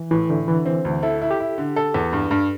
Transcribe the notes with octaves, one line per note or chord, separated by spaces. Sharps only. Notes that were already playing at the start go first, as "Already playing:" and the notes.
Already playing: E3
A2 E3
A2 D3
D3 E3
C4
D2
E4 A4
E4
G4
E4
D3
A4
E2
G2
G2